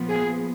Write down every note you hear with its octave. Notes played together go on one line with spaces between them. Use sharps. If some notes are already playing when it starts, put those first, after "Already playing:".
Already playing: A#2 F3 B3
G#4